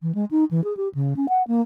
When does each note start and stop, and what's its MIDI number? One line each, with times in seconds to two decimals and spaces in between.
0.02 0.14 52
0.15 0.25 56
0.31 0.44 63
0.51 0.63 52
0.64 0.76 68
0.77 0.88 67
0.95 1.14 49
1.16 1.26 61
1.29 1.43 78
1.48 1.61 58